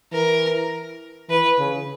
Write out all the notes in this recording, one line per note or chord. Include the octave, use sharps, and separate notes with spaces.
E3 A#4
E3 B4
C#3